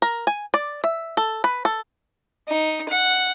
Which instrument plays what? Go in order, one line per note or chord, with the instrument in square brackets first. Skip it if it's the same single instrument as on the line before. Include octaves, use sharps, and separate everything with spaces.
[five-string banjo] A#4
G#5
D5
E5
A4
B4
A4
[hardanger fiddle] D#4
F#5